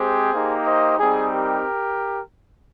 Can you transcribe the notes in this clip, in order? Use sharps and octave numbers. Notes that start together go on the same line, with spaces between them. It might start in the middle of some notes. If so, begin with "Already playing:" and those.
Already playing: G#3 C4 G4 G#4 C5
A#3 D#4 G4
C5 D#5
G3 C4 D#4 G#4
G4 A#4